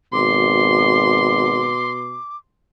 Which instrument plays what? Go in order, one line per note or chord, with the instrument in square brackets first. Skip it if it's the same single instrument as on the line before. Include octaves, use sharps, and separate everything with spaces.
[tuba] G#1 [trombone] B2 [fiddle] C6 [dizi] D6